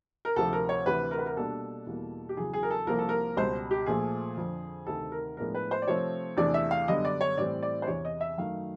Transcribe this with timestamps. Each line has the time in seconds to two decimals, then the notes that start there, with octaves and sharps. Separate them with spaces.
0.25 A#4
0.36 D2 C3 F3 A4
0.53 A#4
0.69 C#5
0.86 D2 C3 E3 B4
1.11 A#4
1.18 B4
1.26 A#4
1.37 B2 G3 A#3 D4 A4
1.86 E2 B2 G3 A#3
2.29 G4
2.37 E2 C#3 F#3 G#4
2.53 G#4
2.63 A#4
2.70 A4
2.87 C2 C3 F3 A#3 A#4
2.99 A4
3.09 A#4
3.36 C#2 B2 G3 C5
3.71 G4
3.86 A#2 F3 A3 G#4
4.37 F2 D3 F3
4.87 D2 C3 D#3 A4
5.12 A#4
5.37 A2 F3 G#3 B3 D4 A#4
5.55 B4
5.71 C5
5.82 D5
5.87 C3 F3 A3 C4 C#5
6.37 E2 C3 E3 A3 D4 D5
6.54 E5
6.71 F5
6.88 F#2 D3 G3 B3 D4 D#5
7.05 D5
7.21 C#5
7.37 A2 E3 G3 C4 D5
7.63 D5
7.82 C5
7.87 E2 C3 E3 C#5
8.05 D#5
8.21 E5
8.38 F#2 D#3 F#3 A3 F5